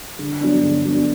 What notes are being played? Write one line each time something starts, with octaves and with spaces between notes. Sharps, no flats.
D3
F#3 B3 D4
D3
F#3 B3 D4